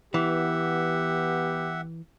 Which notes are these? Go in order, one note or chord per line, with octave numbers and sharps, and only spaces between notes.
E3 B3 G4 E5 F#5